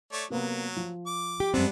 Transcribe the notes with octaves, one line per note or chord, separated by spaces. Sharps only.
A3 C#5 D5
C3 F#3 A#3 B3
F3
D6
G4
F#2 G3 G#3 B3 C4 D4